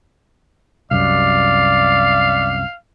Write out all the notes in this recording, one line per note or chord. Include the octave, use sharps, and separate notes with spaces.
C2 F#2 D5 F5